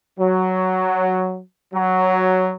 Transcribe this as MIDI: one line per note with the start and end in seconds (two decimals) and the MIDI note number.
0.18 1.39 54
1.73 2.54 54